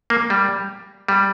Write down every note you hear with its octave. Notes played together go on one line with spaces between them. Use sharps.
A#3
G3
G3